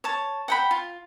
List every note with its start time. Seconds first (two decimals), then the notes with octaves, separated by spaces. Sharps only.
0.04 C#5 A5
0.48 F#5 G5 B5
0.71 F4